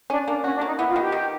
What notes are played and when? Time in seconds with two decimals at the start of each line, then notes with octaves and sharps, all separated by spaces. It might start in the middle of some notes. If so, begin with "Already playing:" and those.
0.10 C#4 D4
0.27 A#3 D4
0.44 C#4 F#4
0.56 D4
0.61 A#3
0.67 D#4
0.78 B3 E4
0.89 F4
0.96 D#3
1.01 G4
1.12 D#3